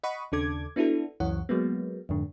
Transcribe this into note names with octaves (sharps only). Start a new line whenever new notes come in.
D#5 F#5 B5 C#6 D#6
D#2 C#3 D4 A4 D6 G#6
B3 D4 E4 F#4 A4
C#2 F#2 E3 C#5 F#5
F#3 G#3 A#3 B3
F2 G#2 D3